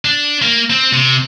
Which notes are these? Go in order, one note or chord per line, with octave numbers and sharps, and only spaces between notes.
D4
A#3
C4
C3